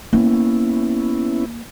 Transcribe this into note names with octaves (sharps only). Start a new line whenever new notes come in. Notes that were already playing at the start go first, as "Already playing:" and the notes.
A#3 B3 C#4 E4